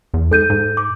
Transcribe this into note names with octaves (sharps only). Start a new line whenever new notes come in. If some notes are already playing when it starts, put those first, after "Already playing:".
E2
G#2 A4 G6 D#7
G#2
D6